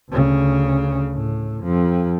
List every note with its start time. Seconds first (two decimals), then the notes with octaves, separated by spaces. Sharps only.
0.11 D2 C#3
1.14 A2
1.63 F2